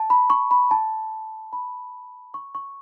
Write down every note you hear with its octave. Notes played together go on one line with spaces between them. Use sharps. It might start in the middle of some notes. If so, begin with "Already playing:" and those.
Already playing: A5
B5
C#6
B5
A5
B5
C#6
C#6